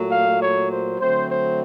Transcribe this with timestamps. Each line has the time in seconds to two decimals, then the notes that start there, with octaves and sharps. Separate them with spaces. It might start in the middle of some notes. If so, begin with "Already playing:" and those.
Already playing: A#2 F#3 A3
0.11 F5
0.41 C#5
0.70 C5
0.99 D3 F#3 A3 C4 C5
1.29 C5